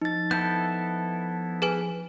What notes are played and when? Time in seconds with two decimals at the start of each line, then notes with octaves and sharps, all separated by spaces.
0.02 F3 D#4 A6
0.31 B3 E4 A4 G6
1.62 G#4 B4 G#5